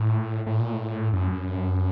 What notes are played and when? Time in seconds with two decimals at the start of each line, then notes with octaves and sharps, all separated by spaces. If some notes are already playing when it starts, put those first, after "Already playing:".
Already playing: A2
0.46 A2
0.60 A#2
0.73 A2
1.13 F#2